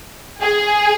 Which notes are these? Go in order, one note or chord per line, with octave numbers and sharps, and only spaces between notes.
G#4